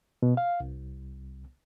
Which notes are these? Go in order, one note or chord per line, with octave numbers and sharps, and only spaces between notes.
B2
F5
C2